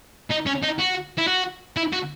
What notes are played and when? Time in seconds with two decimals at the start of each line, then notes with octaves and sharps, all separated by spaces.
0.31 D#4
0.47 C#4
0.63 D#4
0.80 F#4
1.18 E4
1.28 F#4
1.77 E4
1.93 F#4